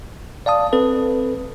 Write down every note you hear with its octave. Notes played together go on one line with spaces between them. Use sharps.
D5 F5 A5 D#6
C4 A4 B4